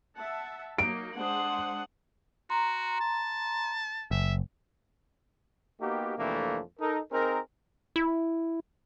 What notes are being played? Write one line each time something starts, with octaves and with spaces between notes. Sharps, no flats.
E5 F#5 A5
F#3 A#3 D#4 D7
G#3 D4 C5 F#5 D#6
F#4 A#5 C6
A5
F#1 E5
A#3 B3 D#4 F#4 G4
F2 C3 E3 A3 A#3 D4
D#4 A4 A#4
C4 D#4 G#4 A#4
E4